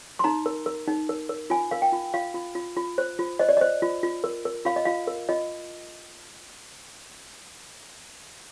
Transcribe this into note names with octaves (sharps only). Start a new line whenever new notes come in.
C6
D#4 A#5
A#4
A#4
D#4
A#4
A#4
F4 G#5
A#4 F5
G5
F4
F4 F5
F4
F4
F4
C5
F4
C5 D#5
D5
C5 D#5
F4
F4
A#4
A#4
F4 F5
D#5
F4 F5
A#4
F4 D#5